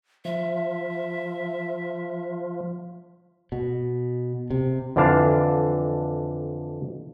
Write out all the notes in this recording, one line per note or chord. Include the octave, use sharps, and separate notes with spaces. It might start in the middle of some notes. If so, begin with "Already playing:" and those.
F3 E5
B2
C3
F2 D3 E3 D4 F5 A5